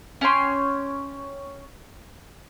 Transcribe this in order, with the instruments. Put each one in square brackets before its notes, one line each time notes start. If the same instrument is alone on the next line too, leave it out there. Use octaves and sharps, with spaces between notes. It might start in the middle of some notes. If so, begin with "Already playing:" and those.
[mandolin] C#4 C#5 G5 C6